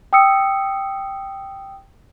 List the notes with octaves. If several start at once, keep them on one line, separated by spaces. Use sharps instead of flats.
G5 D#6 E6 C#7